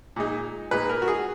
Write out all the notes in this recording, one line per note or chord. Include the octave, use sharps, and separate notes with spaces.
A#2 G#3 D#4
A#2 G#3 D#4 B4
A#4
F#4
G#4